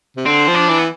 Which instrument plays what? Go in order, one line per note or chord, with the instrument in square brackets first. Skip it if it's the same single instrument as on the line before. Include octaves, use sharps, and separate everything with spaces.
[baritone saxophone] C3
[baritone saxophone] D3 [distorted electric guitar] C4
[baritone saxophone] F3
[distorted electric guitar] D4
[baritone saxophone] E3
[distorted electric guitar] B3